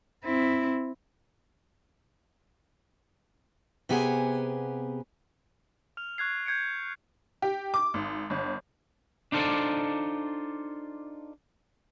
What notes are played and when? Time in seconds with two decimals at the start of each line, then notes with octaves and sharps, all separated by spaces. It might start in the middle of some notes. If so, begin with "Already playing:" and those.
0.24 C4 E4
3.89 C3 B3 G4 G#4 F#5 G#5
5.97 F6 F7
6.18 C#6 F#6 G#6 C7
6.46 G6 G#6 C#7 D7
7.42 G4
7.74 D6
7.94 G#1
8.30 G1
9.32 D4 D#4 F4 A4 C5 D5